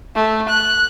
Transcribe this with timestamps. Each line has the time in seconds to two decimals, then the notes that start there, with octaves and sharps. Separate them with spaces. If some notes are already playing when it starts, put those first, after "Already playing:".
0.16 A3
0.49 F#6